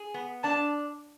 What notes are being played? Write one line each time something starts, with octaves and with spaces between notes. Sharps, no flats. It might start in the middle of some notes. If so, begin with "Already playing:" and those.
Already playing: G#4
B3
D4 A5